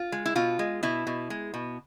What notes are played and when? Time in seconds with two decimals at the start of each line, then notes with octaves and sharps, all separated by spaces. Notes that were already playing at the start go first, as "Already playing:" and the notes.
Already playing: F4
0.12 G#3
0.26 E4
0.35 B2 F4
0.59 G#3
0.83 B2 E4
1.07 B2
1.30 G#3
1.54 B2